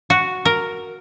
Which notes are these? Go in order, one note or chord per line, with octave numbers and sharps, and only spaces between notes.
F#4
A#4